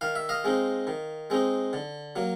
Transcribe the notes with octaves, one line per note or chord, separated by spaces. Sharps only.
D#3 F5
E5
D#5 F5
G#3 C4 D#4
D#3
G#3 C4 D#4
D3
F#3 A#3